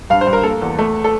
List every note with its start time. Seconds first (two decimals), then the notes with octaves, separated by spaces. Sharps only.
0.10 G2 F5
0.21 C5
0.27 G2
0.33 A#4
0.44 A#3 A4
0.61 E2
0.78 A3
1.04 A4